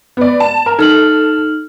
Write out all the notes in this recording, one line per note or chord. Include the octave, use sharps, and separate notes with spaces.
B3 D5
A5
A#4
D#4 A4 F6 F#7